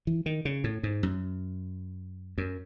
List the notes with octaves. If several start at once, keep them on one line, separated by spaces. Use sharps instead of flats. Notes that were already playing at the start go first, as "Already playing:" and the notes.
E3
D#3
C#3
A2
G#2
F#2
F#2